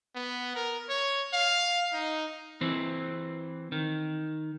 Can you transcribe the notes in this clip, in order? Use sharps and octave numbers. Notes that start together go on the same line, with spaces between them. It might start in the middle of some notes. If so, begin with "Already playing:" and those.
B3
A#4
C#5
F5
D#4
E3 C4
D#3